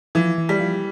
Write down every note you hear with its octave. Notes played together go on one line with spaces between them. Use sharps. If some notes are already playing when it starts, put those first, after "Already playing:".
E3 F3
E3
G3
F3